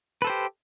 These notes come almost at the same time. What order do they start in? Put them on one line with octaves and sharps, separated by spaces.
B4 A4 C5 G4